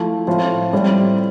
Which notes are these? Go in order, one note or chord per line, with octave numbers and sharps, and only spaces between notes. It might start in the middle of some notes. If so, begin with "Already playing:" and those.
Already playing: F3 A3 E4
A2 F3 C4 F4
A2 G3 C4